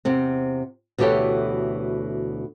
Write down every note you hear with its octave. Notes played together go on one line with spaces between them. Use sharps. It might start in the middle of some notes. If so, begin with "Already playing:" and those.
E2 C3 C4
D2 B2 E3 G4 A4 C#5